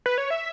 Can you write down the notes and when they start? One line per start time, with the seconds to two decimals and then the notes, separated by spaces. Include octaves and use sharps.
0.06 B4
0.18 C#5
0.30 E5